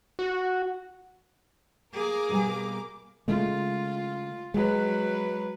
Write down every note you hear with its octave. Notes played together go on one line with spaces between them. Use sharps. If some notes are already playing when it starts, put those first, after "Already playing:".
F#4
A#3 G#4 A#4 D6
B2 G3 G#5
C#3 G#3 A3 F4
F#3 G#3 B4